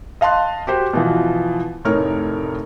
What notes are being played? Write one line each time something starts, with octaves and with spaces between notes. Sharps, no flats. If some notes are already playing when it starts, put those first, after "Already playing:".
D#5 F5 A5 C6 F#6
F#4 G4 C5
B2 E3 F3
F1 A2 D#4 A#4 C#5 F6